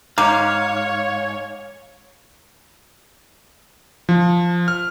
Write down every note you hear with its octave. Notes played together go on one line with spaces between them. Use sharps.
G#2 C#5 F5 A#5 D6
F3
F6